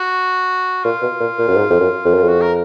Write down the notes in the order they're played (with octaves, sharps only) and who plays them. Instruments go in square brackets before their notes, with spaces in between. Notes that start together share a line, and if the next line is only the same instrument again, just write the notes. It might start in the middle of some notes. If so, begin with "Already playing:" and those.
Already playing: [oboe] F#4
[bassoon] A#2 [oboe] F4
[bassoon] B2
A#2
A#2
F#2
G#2
F2
F#2
F2
F#2
F2
[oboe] F#4
A#4